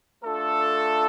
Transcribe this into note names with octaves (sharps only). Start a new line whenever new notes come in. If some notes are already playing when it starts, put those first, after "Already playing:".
A3 D4 F4 A4